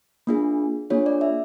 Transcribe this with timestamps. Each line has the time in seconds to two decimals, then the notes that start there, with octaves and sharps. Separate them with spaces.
0.27 A#3 D4 F4 G#4
0.90 A#3 D4 F4 G#4 C#5
1.06 D5
1.21 E5